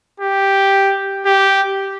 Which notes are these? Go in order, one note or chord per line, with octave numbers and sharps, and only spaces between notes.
G4
G4